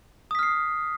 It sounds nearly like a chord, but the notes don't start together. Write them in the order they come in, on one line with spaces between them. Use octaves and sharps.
D#6 B6 F6 C7